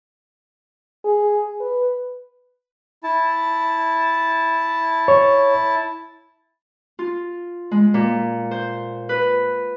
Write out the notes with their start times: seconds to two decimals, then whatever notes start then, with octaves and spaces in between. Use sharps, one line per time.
1.05 G#4
1.60 B4
3.03 E4 A5
5.08 C#5
6.99 F4
7.71 G#3
7.94 A#2
8.51 C5
9.09 B4